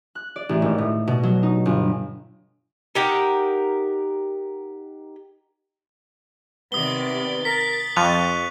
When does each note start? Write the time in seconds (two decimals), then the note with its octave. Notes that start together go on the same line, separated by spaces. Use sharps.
0.15 F#6
0.36 D5
0.49 A1
0.62 G#1
0.78 A2
1.08 B2
1.23 F#3
1.43 D#4
1.66 G1
2.95 D#4 G4 A#4 F#5
6.72 C3 D#3 B3 D5 D#6 G7
7.45 A#4 A6 B6
7.97 F2 C#6 F#6 D#7 F7